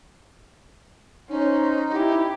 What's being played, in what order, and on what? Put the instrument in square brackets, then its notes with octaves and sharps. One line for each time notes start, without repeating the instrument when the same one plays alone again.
[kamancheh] C#4 C5 [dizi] D#4
[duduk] E4 [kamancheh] G4